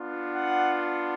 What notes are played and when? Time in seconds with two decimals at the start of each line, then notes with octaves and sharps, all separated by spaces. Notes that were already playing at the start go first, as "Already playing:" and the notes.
Already playing: B3 D4 F4
0.35 F#5